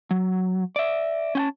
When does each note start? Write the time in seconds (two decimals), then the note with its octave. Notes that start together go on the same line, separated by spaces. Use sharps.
0.11 F#3
0.76 D5 E5
1.35 C#4 G5 A5